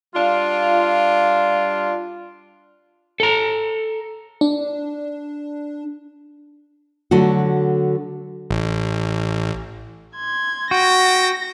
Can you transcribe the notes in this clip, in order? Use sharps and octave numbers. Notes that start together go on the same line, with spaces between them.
G3 D4 F4
A4 A#5
D4
D3 F#3 A3 F#4
A1
C6 G#6
F#4 G5 A#6